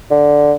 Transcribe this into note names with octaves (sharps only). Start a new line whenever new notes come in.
D3